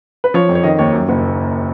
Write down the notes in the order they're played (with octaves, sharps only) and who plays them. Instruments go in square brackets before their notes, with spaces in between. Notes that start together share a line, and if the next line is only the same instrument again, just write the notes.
[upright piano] B4
F3 C#5
F2
C#5
D#3 D#5
D#2 C#5
F#2
F#1